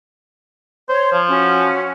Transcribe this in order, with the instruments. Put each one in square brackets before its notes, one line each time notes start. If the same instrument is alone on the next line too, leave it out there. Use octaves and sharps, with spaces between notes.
[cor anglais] C5 [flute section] C#5
[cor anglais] F3
[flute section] C#4 F#4